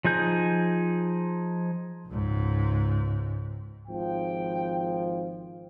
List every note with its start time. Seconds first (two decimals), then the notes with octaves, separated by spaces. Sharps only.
0.04 F3 D#4 G#4 G6
2.06 C#2 G#2
3.88 G#1 F3 G5